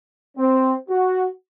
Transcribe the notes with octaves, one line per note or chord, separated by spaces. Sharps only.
C4
F#4